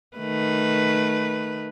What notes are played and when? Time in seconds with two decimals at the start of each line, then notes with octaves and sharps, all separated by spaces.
0.17 D#3 A3 B4